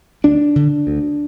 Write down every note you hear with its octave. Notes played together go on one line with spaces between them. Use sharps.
D2 D4
D3
D2